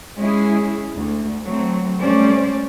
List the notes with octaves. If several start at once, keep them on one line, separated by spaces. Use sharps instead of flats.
G#3 C#4 E4 G#4
D2
F#3 A3 C4
G3 A3 C#4 C5 D5